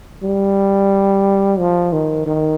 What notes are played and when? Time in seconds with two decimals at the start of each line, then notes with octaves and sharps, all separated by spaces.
0.23 G3
1.59 F3
1.93 D#3
2.26 D#3